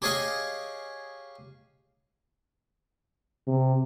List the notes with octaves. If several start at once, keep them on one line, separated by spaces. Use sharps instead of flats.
G4 G#4 C#5 D#5 F5 G#5
C3